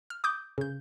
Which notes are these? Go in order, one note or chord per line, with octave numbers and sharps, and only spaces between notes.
F6
D6 D#6 G6
C#3 G6